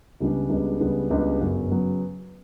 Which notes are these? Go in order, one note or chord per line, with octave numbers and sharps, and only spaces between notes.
C#2 C#3 G3 B3 D4
C#2 C#3 G3 B3 D4
C#2 C#3 G3 B3 D4
C#2 C#3 G3 B3 D4
G1 F#2 C#3 F#3 B3
C#3 F#3 B3